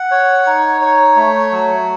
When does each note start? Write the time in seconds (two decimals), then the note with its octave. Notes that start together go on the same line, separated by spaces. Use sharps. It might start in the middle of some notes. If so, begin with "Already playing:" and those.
Already playing: F#5
0.11 C#5
0.46 D#4
0.81 C#5
1.16 A3
1.52 F#3